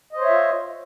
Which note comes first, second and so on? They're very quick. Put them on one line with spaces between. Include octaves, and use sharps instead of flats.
D#5 C5 C#5 E5 F4